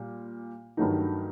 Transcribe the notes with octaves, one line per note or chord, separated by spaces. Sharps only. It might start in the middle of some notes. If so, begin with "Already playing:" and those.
Already playing: A#2 G3
G2 D#3 F#3 A3 D#4